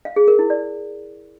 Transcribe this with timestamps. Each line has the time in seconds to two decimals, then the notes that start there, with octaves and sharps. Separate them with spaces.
0.05 F5
0.16 G#4
0.28 A#4
0.39 E4
0.50 D5